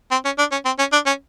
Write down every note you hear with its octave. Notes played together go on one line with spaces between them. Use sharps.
C4
C#4
D4
C#4
C4
C#4
D4
C#4